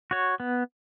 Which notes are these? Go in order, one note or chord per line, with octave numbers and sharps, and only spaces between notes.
F#4 C#5
B3